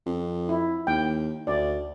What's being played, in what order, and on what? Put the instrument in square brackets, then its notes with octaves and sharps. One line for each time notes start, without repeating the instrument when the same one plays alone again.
[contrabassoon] F2
[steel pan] E4
[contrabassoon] D#2 [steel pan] G5
[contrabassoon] D2 [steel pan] D5